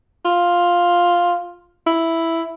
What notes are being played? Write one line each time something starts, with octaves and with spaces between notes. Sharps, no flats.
F4
E4